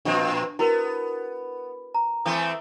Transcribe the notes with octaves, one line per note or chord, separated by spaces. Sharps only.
A#2 F3 C4 D4
B3 E4 F#4 A#4
A#5
E3 A3 C4 D#6